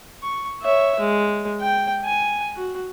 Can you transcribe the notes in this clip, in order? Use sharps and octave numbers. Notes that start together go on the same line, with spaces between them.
C#6
C#5 E5
G#3
G5
G#5
F#4